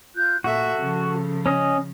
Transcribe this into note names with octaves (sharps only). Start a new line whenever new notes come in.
F4 F#6 G6
A#2 F#4 A4 E5
C#3 F3
C#4 D#5